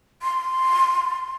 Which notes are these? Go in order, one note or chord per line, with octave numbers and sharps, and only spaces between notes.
C6